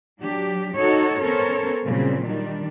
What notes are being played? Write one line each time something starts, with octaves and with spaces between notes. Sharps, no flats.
F#3 D4 G4
D#4 F#4 A4 C#5
B3 C#4 A4 A#4 C5 C#5
A#2 C#3 F#3 G3 C4
D#3 G3 D4